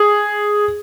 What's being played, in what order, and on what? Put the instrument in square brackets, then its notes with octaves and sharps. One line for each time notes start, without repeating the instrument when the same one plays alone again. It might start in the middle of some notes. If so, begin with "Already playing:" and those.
Already playing: [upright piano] G#4